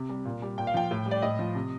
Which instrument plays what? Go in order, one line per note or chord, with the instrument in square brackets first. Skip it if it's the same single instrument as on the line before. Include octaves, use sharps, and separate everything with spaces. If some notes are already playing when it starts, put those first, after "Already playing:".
Already playing: [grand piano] C3
G3
A#2
G3
A#2 G5
F5
F3 G5
A2
G3
D5
A2 D#5
F3
C3